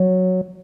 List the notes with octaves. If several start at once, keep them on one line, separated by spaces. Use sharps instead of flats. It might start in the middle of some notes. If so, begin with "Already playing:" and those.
Already playing: F#3